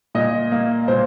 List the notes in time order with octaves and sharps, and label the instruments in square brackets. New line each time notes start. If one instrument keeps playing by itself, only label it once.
[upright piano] A#2 D#5
A#3
A#2 C5